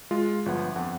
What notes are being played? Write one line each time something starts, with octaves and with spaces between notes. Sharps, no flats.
G#3 F4
G1 F3 B3 F#5
F2 F#5